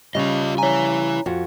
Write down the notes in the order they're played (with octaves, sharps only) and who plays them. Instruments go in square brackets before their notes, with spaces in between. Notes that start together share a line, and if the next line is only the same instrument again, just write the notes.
[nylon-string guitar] C#3 G3 [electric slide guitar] F4 D#5
[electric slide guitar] E4 G#5 [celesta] C#5 A#5
[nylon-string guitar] F2 F#4